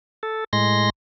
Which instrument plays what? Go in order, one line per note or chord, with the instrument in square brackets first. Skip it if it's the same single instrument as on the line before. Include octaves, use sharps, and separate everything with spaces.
[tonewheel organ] A4
A2 G#3 C6 A#6